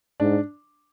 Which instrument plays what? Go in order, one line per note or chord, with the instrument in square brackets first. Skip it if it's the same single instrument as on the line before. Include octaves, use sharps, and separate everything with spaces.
[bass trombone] G#2 [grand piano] D4